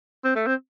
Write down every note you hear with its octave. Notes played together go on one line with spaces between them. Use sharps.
C4
A3
C4